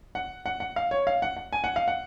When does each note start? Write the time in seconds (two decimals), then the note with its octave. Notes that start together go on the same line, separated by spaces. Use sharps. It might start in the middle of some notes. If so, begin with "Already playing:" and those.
0.15 F#5
0.46 F#5
0.60 F#5
0.76 F5
0.91 C#5
1.07 F5
1.22 F#5
1.37 F#5
1.53 G#5
1.64 F#5
1.76 F5
1.88 F#5